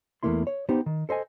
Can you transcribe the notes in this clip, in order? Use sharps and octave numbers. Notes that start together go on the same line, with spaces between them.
E2 G2 A3 A#3 E4 C6
C#5
B3 D#4 G4 C5
D#3
A4 C5 D#5 G#5